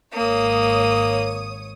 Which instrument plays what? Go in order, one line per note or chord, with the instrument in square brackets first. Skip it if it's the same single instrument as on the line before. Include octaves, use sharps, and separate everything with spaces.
[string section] G#1 C#5 D#6 [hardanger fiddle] A#3